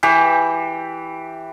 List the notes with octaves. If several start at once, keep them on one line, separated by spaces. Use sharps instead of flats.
E3 G4 B5